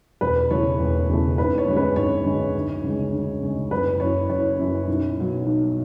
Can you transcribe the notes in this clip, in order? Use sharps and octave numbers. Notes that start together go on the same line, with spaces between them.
E1 B4
E2 C#3 E3 A3 C#5
E1
E2 C#3 E3 A3
G#1 B4
C#5
F#2 D3 G#3 C#4
B4
G#1 C#5
F#2 D3 G#3 C#4
D2
C#3 G#3
D2
C#3 G#3
F#1 B4
F#2 E3 C#5
F#1 C#5
F#2 E3
B1
B2 F#3
B1